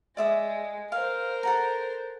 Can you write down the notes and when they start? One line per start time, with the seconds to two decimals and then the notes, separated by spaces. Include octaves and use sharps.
0.17 G#3 D5 E5 D#6
0.92 A#4 C5 F5
1.43 A4 F#5 A#5